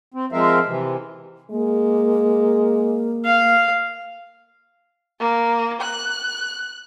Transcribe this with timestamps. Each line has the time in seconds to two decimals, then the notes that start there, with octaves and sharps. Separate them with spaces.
0.14 C4
0.32 F3 G#3 C4 A#4 E5 F5
0.67 C3 E3
1.51 G#3 A#3
3.25 F5
5.20 A#3
5.81 F#6